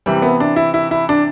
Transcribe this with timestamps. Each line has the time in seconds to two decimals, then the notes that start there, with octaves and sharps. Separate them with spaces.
0.06 C3 E3 G3
0.22 B3
0.40 D4
0.56 E4
0.74 E4
0.91 E4
1.09 D4